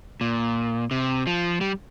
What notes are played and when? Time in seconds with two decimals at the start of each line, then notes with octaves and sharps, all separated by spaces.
0.21 A#2
0.91 C3
1.27 F3
1.61 G3